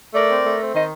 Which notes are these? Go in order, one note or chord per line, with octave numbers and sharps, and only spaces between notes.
A3 A#4 D5
C4
A3
C4
D#3 C5 D#5